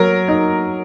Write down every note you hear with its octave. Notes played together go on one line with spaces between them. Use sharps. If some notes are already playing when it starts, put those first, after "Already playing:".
Already playing: F#3 A#4
D#4